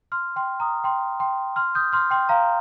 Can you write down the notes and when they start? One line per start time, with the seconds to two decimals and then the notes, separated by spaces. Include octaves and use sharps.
0.12 C6 F6
0.36 G5 C6
0.60 A#5 D#6
0.84 G5 C6
1.20 G5 C6
1.56 C6 F6
1.75 D#6 G6
1.93 C6 F6
2.11 G5 C6
2.29 F5 A#5